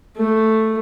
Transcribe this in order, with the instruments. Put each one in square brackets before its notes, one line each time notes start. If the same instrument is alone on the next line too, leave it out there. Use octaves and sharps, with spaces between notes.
[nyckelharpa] A3